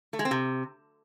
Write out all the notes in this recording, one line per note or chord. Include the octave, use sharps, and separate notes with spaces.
A3
G#3
C4
C3